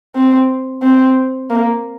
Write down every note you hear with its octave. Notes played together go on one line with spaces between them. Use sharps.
C4
C4
A#3